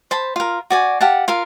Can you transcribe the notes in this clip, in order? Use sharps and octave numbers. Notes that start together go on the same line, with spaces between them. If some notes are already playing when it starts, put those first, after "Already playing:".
C5 A5 B5
F4 A#4
F#4 D5 G#5
G4 F5 F#5 A5
F4 A#4 F5